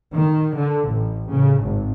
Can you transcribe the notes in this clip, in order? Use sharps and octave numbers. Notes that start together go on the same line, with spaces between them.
D#3
D3
A1
C#3
G#1